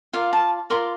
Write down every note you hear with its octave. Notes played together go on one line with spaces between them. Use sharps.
F4 A#4 D5 F5
A5
F4 A#4 D5 C6